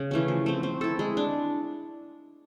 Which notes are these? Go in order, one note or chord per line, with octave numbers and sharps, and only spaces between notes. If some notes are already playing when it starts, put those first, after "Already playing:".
Already playing: C#3
E3 A3 C#4
F3
A3 C4
C4
E4 A4
G#3
D4